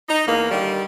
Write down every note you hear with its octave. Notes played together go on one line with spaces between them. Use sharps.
D#4
E2 A#3
D3 D#3 G3